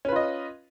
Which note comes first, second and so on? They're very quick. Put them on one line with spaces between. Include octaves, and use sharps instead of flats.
C#4 B4 F4 D#5